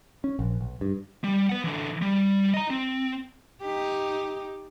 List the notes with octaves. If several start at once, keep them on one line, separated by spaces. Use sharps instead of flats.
C#4
A#1
B1
G2
G3
B3 F#5
D3 E3
G3
D#5 A#5
C4
D#4 G4